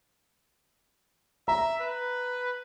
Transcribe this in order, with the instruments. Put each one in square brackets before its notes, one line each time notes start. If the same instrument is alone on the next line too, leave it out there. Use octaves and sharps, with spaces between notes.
[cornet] E5 [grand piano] A#5
[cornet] B4